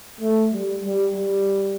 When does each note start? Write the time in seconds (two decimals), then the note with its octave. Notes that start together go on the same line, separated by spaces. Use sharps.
0.21 A3
0.53 G3
0.85 G3
1.16 G3